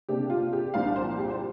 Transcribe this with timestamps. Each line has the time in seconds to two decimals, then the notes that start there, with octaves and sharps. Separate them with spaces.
0.09 C3 A#3 D4 G4
0.30 F4
0.53 G4
0.74 C2 A#2 F3 D4 F5
0.96 C5
1.19 G4
1.30 C5